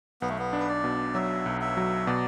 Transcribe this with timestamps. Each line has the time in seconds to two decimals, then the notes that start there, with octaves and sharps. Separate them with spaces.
0.21 B1 B3
0.29 A3
0.38 B3
0.53 D4
0.60 B4
0.69 D5
0.84 B2
1.14 F#3 E5
1.46 B1
1.61 E5
1.77 F#3
2.07 B2 D5